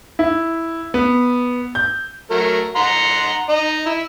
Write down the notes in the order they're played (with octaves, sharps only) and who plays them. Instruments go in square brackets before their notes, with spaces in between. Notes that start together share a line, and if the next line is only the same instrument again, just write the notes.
[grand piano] E4
B3
G6
[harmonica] F#3 A3 A#4
F#5 A#5 C6
D#4 D#5
E4